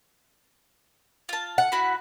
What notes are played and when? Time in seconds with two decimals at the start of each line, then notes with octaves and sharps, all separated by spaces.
1.29 F4 A5
1.58 F#5
1.72 E4 F#4 B5